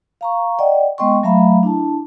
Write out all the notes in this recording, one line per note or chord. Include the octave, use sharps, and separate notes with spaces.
F5 A#5 C#6
D5 D#5 F#5 G5
G#3 B3 D#5 G5 C6 C#6
F#3 A3 E5 F5 A#5 B5
D4 E4 A5